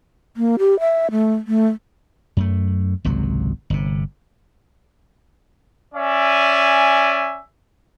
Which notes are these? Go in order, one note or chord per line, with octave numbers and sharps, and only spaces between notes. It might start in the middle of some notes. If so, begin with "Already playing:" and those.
A#3
G4
E5
A3
A3
F#2 A3
G#1 C#2 C3 F#3
G1 C3
C#4 D5 E5 G#5